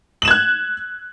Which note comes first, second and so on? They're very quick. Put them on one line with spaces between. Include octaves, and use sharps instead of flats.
F#7 E7 G#6 F#6